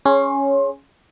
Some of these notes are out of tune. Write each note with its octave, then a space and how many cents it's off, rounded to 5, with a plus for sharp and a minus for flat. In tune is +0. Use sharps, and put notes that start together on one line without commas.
C#4 +0 G#4 +0 C6 +25